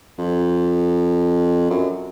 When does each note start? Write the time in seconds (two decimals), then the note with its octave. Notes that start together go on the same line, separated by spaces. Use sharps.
0.18 F2
1.70 F#2